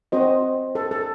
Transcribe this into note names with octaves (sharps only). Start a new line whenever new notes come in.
C4 F#4 C5 D#5
A4
A4